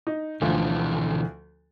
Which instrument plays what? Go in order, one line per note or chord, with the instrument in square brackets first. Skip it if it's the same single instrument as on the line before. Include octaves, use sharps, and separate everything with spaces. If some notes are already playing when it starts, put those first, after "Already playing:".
[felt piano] D#4
[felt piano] D2 F3 [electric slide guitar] B2 D3 E3